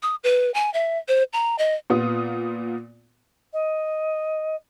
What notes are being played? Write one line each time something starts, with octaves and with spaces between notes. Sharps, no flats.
D#6
B4
G#5
E5
C5
A#5
D#5
A#2 B3 F4 D#6
D#5